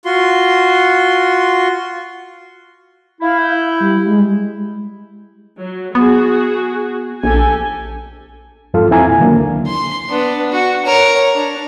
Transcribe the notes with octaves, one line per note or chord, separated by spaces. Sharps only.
F4 F#4 C6
E4 F5
G6
G3
G#3
F#3
B3 F#4 G#4
A#1 G4 A4 G#5
C2 F2 G#2 F4 A4 F5
E2 C4 E4 G#5 A#5
A#2
D3 D#3 F#3 A#3 D4
C#2
C6
B3 D4
F#4
A#4 C#5
D4